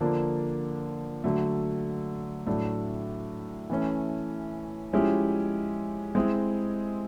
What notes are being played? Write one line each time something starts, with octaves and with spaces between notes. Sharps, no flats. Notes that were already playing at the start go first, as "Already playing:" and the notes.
D3 F3 A#3 D4
D3 F#3 A3
A2 F#3 A3 D4
E3 A3 C#4
F3 G#3 C#4 E4 G4
G#3 C4 E4 G#4